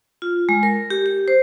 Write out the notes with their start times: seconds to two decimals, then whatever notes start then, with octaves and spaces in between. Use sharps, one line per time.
0.22 F4
0.49 G#3
0.63 A#4
0.90 G4
1.06 G4
1.28 C5